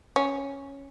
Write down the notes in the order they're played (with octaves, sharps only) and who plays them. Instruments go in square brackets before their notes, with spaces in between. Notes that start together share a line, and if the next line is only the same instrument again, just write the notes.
[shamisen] C#4